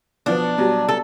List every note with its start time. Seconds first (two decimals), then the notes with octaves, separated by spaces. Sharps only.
0.26 B2 F3 B3 D4
0.58 B2 F#3 G3
0.89 A4